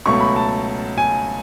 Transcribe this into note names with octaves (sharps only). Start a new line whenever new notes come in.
C#2 B2 F#3 A3 C#6
B5
A5
G#5